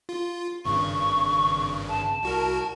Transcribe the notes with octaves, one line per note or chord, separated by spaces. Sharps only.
F4
G#1 G2 C#3 C#6
A5
C2 F#4 A#4